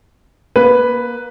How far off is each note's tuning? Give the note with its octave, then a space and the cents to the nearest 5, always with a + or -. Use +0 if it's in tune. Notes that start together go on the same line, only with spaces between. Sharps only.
A#3 +30 B4 +0